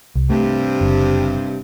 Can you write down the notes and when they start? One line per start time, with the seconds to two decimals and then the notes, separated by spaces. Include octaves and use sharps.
0.15 C2
0.30 G2 C3 A3
0.81 F#1